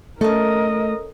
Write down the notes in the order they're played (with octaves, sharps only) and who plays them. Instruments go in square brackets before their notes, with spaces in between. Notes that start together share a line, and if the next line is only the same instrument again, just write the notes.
[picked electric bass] A3 [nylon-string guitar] C#4 A4 [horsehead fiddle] A#4 D#5